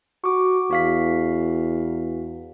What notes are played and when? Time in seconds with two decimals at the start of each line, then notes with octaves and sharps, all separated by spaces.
0.24 F#4 C#6 D6
0.71 E2 F#4 F5 B6